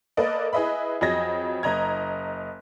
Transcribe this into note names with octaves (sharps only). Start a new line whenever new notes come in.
A#3 A4 B4 D5 D#5
E4 G#4 B4 D#5 E5 B5
F2 F#3 G#4 D#5 G#6 A#6
F#1 D#5 A#5 G#6